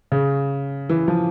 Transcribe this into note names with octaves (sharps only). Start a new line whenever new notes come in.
C#3
E3
F3